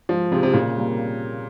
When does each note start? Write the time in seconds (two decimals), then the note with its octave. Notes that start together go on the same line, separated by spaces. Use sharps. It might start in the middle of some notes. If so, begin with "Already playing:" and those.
0.09 G#2 F3
0.31 C3 F3 C4 F4 G#4
0.43 C3
0.53 A#2 C#3
0.76 G3 A#3